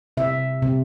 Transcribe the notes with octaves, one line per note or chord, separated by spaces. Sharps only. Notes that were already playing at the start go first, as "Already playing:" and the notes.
C3 E5
C3